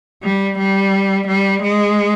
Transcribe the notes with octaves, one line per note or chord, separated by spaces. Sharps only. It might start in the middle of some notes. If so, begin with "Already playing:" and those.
G3
G3
G3
G#3